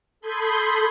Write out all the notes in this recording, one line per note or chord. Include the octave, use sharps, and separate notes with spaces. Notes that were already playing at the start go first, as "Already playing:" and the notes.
A4 B5 C6 D#6 G6 G#6